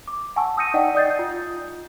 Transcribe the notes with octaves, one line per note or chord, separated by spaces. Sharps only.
D6
F#5 G#5 A5 C#6 E6
D#6 E6 G6 A#6 C#7 D#7
D#4 D5 D#5 F#5 G5
D5 D#6 G6 A6 C7
F4